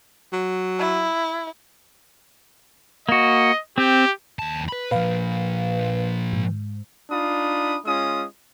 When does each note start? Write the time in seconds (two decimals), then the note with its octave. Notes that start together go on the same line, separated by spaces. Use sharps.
0.33 F#3
0.79 E4
3.09 A#3 F#4 D#5
3.78 C4 G4
4.39 D#2 A5
4.69 B4 B5
4.91 A#2 F3 B4 F5
6.33 G#2
7.10 D4 D#4 F4 B5 D#6
7.85 G#3 C#4 F4 D#6